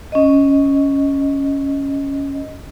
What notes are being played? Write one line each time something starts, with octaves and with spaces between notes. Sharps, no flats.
C#4 D#5